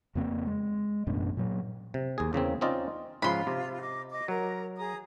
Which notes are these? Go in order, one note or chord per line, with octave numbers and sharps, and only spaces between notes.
F2 C#3 A#3 C4
G#3
A1 F#2 B2 D4
A#2 F#3
C3
D#2 G#4
E2 C#3 A#3 C4
C4 C#4 D#4 F4 D5 D#5
G#2 C#3 F3 F4 B5 C6
C3
D#5 D6
D#5 D6
F#3 A#4 A#5
G#4 A#5 D#6